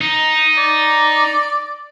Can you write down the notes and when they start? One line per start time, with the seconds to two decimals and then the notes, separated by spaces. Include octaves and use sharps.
0.01 D#4
0.58 D5